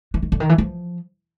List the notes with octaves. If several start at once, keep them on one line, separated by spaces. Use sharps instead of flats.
E3
D#3
D3
D#3
E3
F3